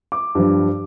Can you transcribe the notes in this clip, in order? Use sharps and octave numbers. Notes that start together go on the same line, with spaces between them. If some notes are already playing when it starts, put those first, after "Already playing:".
D6
G2 F3